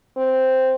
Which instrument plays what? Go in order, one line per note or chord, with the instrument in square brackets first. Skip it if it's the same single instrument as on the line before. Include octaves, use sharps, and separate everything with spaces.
[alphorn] C4